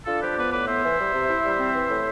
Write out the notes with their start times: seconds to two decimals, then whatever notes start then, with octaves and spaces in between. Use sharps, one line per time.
0.06 D4 F4 A4
0.22 F3 G4 B4
0.37 B3 B4 D5
0.52 A2 B4 D5
0.67 B3 C5 E5
0.83 E3
0.99 G3
1.14 C3
1.29 E4
1.44 G3
1.60 C4
1.74 E3
1.89 A2